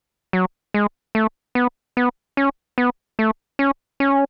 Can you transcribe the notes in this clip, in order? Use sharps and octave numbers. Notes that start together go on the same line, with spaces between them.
F#3
G#3
A3
B3
B3
C#4
B3
A3
C#4
C#4